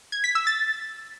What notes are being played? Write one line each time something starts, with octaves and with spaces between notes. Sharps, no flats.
G#6
B6
E6
A6